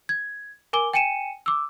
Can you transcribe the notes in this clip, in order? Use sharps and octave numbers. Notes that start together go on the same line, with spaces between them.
G#6
A#4 G#5 D6 G7
G5 G#5 C#7 D#7 E7
D6 E6